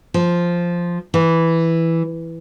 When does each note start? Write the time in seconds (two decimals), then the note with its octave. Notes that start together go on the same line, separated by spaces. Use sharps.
0.14 F3
1.14 E3